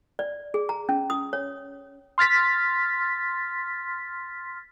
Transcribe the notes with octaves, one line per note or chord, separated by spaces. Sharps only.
D5
G#4
A#5
C#4
D#6
C#5
C6 F6 A6 B6